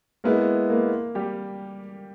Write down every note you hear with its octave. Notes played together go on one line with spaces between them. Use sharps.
G#3 A#3 B3 E4 A#4
A#3 A#4
G3 G4